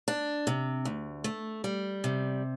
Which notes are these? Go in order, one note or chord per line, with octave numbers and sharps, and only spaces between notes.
D4
C3
D2
A3
G3
C3